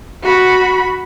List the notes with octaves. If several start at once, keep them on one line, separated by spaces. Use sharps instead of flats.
F#4 B5